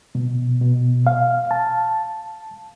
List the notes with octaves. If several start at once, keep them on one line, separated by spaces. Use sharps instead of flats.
B2
B2
F5
A5